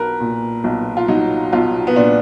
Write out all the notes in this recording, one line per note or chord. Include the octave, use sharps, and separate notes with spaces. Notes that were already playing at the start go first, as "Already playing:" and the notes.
Already playing: B1 F#3 A#4 B4
A#2
B1
F4
F#3 D#4
B1 F4
B3
A#2 D4